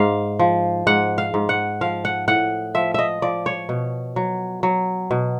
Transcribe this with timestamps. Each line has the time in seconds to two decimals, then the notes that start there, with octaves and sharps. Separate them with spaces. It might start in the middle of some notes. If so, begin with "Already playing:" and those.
Already playing: G#2 F5
0.39 F3
0.87 G#2 F#5
1.18 F5
1.34 G#2
1.49 F#5
1.81 F3 F5
2.05 F#5
2.28 A2 F#5
2.75 F3 E5
2.94 D#5 E5
3.22 F3 D5
3.46 C#5
3.69 B2
4.16 F#3
4.63 F#3
5.11 B2